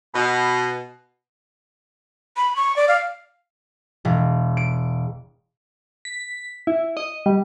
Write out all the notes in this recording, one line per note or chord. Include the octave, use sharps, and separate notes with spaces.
B2
B5
C#6
D5
F5
E1
D7
B6
E4
D#5
G3